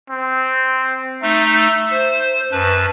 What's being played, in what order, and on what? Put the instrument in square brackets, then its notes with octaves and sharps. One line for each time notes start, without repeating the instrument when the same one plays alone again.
[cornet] C4
[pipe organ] A3 D#4 [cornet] E5
[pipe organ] C5
F#2 B4 A5